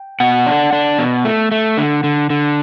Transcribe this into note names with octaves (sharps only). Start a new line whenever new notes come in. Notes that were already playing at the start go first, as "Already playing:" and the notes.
Already playing: G5
B2 F#5
D4
D4
B2
A3
A3
D3
D3
D3